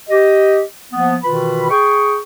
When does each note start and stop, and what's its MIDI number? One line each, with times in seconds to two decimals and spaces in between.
0.09 0.61 67
0.09 0.61 75
0.92 1.16 53
0.92 1.16 58
0.92 1.16 59
1.24 1.66 47
1.24 1.66 51
1.24 1.66 52
1.24 1.66 65
1.24 1.66 71
1.24 1.66 83
1.70 2.19 68
1.70 2.19 79
1.70 2.19 85